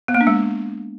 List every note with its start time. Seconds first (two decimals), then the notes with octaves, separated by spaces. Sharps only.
0.08 B3
0.15 A#3
0.21 D4
0.27 G#3